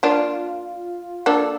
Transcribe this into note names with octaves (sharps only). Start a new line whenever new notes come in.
A#3 D4 F4
A#3 D4 A4